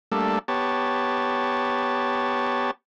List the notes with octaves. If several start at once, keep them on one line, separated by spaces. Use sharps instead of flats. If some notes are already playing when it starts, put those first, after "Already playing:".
G3 A3 A#3 D4 A4
B3 G4 C#5 A5